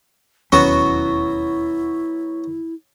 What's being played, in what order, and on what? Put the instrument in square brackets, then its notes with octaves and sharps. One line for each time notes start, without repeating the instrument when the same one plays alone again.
[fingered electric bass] E1 D#2 C#4 [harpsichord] F#3 B3 F#4 [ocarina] E4